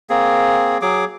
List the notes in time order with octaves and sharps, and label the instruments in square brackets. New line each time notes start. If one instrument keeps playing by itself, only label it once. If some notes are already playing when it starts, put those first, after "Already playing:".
[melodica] A#3 C4 G#4
F#3 G#4 D6